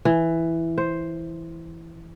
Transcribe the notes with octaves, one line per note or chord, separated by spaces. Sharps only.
E3
C5